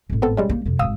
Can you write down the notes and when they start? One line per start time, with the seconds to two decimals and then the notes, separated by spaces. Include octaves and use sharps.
0.10 G#1 A2
0.22 B3 C4 A4
0.37 G3 G#3 C#4
0.49 A#3 D#4
0.66 F2 C3
0.79 G#1 G#2 F5 D#6 E6